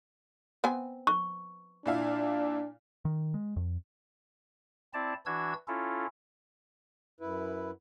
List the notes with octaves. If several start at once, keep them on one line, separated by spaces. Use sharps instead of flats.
B3 C4 G#5
C#6
A#2 D4 E4 F5
D#3
G#3
F2
C4 E4 D5 A5
E3 D4 F#4 E6 G#6
C#4 E4 F4 A4
F#2 E4 B4